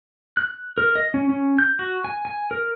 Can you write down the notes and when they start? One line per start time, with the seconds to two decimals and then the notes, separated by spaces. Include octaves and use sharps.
0.37 F#6
0.78 A#4
0.95 D#5
1.14 C#4
1.29 C#4
1.58 G6
1.79 F#4
2.04 G#5
2.25 G#5
2.51 A#4